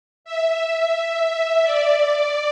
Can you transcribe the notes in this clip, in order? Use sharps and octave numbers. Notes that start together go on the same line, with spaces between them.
E5
E5
D5